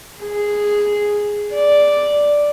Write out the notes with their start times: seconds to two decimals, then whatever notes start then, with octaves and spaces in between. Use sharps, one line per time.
0.23 G#4
1.53 D5